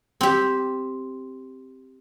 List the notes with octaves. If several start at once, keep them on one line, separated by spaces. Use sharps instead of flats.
C4 G4